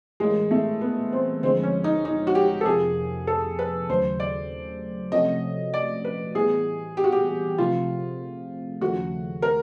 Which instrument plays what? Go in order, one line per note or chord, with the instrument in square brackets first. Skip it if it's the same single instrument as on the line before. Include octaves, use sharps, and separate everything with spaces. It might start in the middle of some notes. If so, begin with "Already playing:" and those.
[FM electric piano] A2 E3 G3 A#3 C#4 [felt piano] G#3
[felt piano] A3
B3
C4
[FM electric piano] D2 D3 F3 G#3 [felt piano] C4
[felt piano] C#4
D#4
D#4
F#4
G4
A4
[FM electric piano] F2 C3 F3 A#3 [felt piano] G#4
[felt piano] A4
B4
[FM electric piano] D#2 C#3 F#3 A3 [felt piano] C5
[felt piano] D5
[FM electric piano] C3 F3 A3 C#4 F#4 [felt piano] D#5
[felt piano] D5
B4
[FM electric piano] A2 E3 G3 B3 [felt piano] G#4
[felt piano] G4
F#4
G4
[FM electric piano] C3 F3 A3 C4 [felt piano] F4
[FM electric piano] D#2 C#3 F3 A3 [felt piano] F#4
[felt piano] A#4